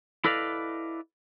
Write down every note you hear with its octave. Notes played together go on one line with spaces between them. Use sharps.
E4 A4 B4 D5 D#5 F5